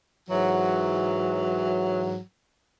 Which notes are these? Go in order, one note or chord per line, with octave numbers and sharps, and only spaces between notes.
G#2 E3 F#3